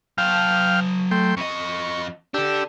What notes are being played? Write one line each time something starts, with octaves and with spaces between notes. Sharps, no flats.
F#3 F5 G5 A5 F6
A3 G5 C6
F2 D#5 C#6
D4 G4 A4 E6